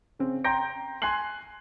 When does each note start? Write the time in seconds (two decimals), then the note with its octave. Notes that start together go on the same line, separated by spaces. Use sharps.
0.19 C#3 C4
0.44 G5 A#5 C6 G6 A#6 D7
1.02 G#5 C6 F#6 C7 F#7